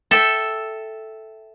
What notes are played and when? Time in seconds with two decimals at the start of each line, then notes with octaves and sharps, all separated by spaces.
0.11 A4 E5 G5